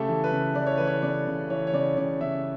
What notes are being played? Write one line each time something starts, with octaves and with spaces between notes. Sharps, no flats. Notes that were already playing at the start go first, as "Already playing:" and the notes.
Already playing: C#3 A3 G4 A4
E3
B4
C#3
E3 D5
C#5
E3 B4
C#5
C#3 D5
C#3
E3 C#5
C#5
C#3 D5
C#3 D5
C#3 E5